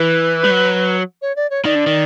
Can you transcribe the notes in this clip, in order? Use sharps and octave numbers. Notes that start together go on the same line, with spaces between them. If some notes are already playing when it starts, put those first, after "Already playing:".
Already playing: E3 B4
G3
F#3
C#5
D5
C#5
D#3 D5
D3
D#3